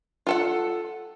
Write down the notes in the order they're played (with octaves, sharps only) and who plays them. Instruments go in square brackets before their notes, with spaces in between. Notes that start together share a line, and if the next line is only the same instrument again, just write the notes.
[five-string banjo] F4 A4 F#5